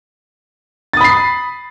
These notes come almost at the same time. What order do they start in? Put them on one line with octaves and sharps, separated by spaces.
A6 D#6 B5 C7